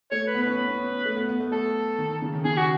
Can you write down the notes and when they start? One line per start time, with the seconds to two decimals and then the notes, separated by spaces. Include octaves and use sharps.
0.12 A3 C#5
0.27 B4
0.35 B3
0.42 C#4 B4
0.57 B3
0.68 C#4
0.78 B3
1.06 A3
1.16 B3
1.29 B3
1.40 A3
1.52 A3 A4
1.99 D#3
2.22 C#3
2.33 D#3
2.45 C#3 G#4
2.57 F#4